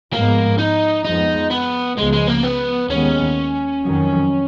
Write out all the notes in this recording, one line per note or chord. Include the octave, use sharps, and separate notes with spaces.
G#2 F3 G#3 A#3 B3
D#4
F2 F3 G#3 B3 D#4
B3
C#2 C#3 F3 G#3 B3
G#3
A#3
B3
D#2 D#3 G#3 B3 C#4
F2 D#3 F#3